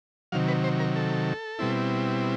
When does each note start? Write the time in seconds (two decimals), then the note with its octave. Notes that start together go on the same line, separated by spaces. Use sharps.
0.32 C3 D#3 F#3 F5
0.48 B4
0.64 C5
0.80 A#4
0.96 A4
1.59 B2 G3 C4 E4